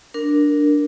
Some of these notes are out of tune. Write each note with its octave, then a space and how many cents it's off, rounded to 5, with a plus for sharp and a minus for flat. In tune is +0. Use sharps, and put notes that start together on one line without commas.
D4 +0 A#4 +0